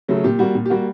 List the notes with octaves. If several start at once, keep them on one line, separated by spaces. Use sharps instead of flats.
C#3 F#3 A3
A#2 G4
G3 A#3 F#4
A#2
G4
G3 A#3 F#4